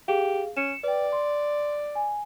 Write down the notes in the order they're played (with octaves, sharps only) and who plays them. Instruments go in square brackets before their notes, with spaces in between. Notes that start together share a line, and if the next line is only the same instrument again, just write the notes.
[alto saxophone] G4 [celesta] G#4 F5
[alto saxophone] C#4 [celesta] C#7 E7
[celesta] B4 G5 [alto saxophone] D5
[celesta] C6
G#5